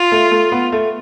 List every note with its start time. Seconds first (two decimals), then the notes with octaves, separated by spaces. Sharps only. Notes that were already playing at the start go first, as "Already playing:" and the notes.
Already playing: F4
0.12 A3
0.32 A3
0.52 B3
0.72 A3